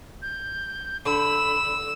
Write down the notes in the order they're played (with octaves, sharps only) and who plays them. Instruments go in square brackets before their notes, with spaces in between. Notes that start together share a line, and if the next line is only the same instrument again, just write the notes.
[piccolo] G6
[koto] D3 [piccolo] B5 [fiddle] E6